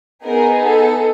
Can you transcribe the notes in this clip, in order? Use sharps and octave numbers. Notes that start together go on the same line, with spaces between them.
B3 D#4 G#4 A#4
A4